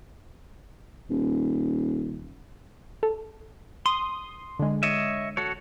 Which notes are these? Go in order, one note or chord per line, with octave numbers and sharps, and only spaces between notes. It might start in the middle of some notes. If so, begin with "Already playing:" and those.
D#1
A4
C6 D#6
D3 G#3
C#5 D#5 E5
F#4 A4 C#5